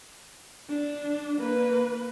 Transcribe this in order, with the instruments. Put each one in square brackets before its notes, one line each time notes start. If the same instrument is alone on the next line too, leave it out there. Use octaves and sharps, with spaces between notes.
[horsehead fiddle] D4
A#3 B4